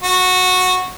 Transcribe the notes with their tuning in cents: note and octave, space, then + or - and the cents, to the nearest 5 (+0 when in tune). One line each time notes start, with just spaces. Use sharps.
F#4 -10